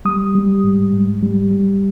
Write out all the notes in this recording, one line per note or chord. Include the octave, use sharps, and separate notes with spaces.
G3 D#6
G3
G#2
G#2
G3
G3